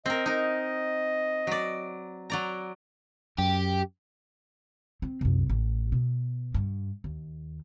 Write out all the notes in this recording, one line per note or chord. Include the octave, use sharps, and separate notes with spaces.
C4 A#4 D#5
D#4 A#4
F#3 D5
F#3 D5 A#5
F#2 G4
C4
C2 F#2
A1
B2
G2
D#2